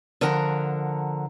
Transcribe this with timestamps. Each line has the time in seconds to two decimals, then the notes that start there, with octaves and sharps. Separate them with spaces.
0.21 D3 F3 A#4 F#5 A#5